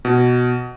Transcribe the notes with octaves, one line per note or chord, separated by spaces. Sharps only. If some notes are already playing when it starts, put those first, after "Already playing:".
B2